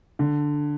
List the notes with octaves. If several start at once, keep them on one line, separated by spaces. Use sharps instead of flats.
D3